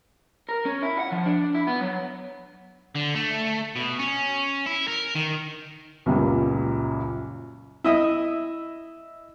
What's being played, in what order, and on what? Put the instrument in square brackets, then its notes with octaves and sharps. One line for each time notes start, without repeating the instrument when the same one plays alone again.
[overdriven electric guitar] A#4
C#4
E4
F#5
F3
D4
E4
B3
F#3
[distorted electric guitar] D3
A3
B2
C#4
E4
A#4
D#3
[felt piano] C#2 F#2 A#2 C#3 G3
[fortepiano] E4 D#5 E5